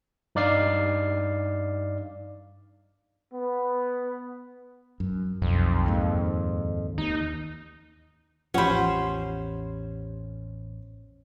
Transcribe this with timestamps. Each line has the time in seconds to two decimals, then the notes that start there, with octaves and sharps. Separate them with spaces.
0.35 G2 D#4 D5 F5 C7
3.33 B3
5.00 F#2
5.42 B1 F2
5.86 D#2 G#2
6.98 D#2 D#4
8.54 A1 E2 F3 C#4 G4 C5 F#5 B5